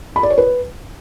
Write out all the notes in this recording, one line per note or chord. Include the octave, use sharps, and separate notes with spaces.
B5
D5
C#5
B4